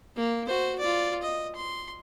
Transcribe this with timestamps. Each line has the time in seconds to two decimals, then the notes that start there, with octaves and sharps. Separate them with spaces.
0.16 A#3
0.47 F#4 C5
0.79 F4 D5
1.22 D#5
1.56 C6